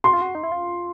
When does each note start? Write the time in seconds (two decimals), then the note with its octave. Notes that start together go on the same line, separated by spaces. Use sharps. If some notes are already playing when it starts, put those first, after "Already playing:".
0.04 F#4 C6
0.13 F4
0.22 F#4
0.35 D#4
0.43 E4
0.52 F4